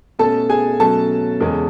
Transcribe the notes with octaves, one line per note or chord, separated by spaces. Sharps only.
B2 A3 C#4 A4 A5
G#4 G#5
B2 F#3 A3 C#4 A4 A5
E2 C#3 G#3 C#4